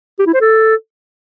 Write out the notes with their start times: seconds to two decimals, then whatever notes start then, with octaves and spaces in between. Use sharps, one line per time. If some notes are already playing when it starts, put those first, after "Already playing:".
0.19 G4
0.26 E4
0.34 C5
0.41 A4